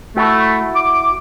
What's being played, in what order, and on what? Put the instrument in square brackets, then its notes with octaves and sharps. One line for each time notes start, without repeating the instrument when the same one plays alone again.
[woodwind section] A3 [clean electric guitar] E4 F#4
[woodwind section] D6